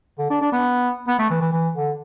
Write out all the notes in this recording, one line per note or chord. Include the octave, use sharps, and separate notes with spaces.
D3
D4
D4
B3
B3
A3
E3
E3
E3
D3